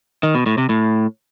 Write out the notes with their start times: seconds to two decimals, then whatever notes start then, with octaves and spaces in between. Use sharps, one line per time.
0.23 D#3
0.35 B2
0.46 A2
0.58 C3
0.69 A2